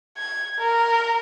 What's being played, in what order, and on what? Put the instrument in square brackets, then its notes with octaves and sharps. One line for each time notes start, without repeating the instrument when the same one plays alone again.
[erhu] G#6
A#4